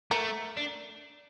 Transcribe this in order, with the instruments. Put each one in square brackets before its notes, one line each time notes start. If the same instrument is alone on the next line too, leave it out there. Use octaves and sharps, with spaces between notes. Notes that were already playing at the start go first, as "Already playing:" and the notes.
[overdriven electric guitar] A3 [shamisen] A#4
[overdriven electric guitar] D4